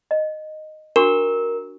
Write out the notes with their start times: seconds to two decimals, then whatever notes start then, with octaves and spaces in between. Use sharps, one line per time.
0.11 D#5
0.96 D4 F#4 A#4 C#6